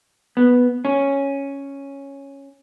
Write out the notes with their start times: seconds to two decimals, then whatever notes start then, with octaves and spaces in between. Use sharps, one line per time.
0.37 B3
0.85 C#4